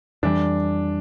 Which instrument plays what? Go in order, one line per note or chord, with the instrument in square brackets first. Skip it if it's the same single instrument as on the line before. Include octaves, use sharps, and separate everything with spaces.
[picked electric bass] F2 E3 G3 [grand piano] D4